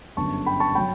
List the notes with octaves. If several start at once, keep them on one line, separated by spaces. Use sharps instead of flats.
G1 F#2 D3 A5 C#6
G5 B5
A5 C#6
F#3 G5 B5